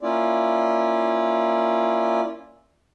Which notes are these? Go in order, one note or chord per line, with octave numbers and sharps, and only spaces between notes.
A#3 C#4 E4 F4 D5